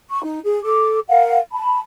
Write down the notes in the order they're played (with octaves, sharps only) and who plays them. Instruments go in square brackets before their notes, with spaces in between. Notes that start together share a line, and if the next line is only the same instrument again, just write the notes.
[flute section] C#6
D#4
G#4
A4 D6
A#4 F5 F#5
A5 B5